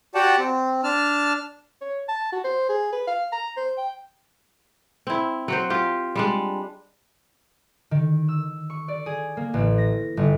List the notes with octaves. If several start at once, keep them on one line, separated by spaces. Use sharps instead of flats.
F#4 G4 D5 F#5 G5 A5
C4
D4 A5 F6
C#5
A5
F#4
C5
G#4
B4
F5
A#5
C5
G5
C4 E4
F#3 F#4 C5
F4 G4
G3 G#3 D4
D#3
E6
C#6
D5
G#4
A#3
A1
A#6
G1